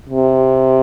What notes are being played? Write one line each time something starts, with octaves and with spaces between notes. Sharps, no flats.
C3